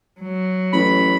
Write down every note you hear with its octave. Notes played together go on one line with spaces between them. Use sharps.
F#3
A1 B5